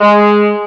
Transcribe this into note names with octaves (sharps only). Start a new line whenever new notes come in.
G#3